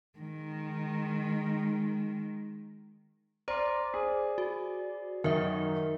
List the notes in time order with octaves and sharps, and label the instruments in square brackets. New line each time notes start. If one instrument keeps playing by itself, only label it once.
[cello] D#3 G#3
[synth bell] C5 [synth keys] D5 [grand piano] A#5 C6
[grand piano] G#4
[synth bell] F#4
[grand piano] F#2 [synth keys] D#3 [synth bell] A#4 E5